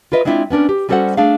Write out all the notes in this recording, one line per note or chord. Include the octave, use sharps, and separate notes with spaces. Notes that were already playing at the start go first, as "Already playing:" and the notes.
F4 A#4 B4 D#5 E5
G#3 C4 D4 E4 F4 E5
B3 C#4 D4 A#4
G4
G3 C#4 F#4 A4 C5 F#5
A3 D4 G#4 F5